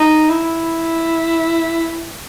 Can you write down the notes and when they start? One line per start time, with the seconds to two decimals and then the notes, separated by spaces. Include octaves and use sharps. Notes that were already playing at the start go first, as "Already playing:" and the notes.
Already playing: D#4
0.30 E4